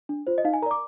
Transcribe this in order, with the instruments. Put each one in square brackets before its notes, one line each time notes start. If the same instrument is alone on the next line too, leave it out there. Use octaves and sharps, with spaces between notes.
[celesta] D4
F4 C5
D#5
D#4 F5
G#5
A#4 A#5
D5 D6